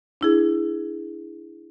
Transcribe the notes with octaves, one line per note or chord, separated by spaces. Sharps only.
D4 E4 G#4